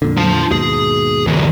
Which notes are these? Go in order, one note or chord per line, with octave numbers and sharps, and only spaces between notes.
F2 A#2 D3
F4 A5
D#2 G#2 B2 G#4
D2 E3